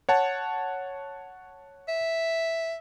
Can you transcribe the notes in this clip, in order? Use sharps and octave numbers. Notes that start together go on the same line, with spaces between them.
C#5 F#5 A5
E5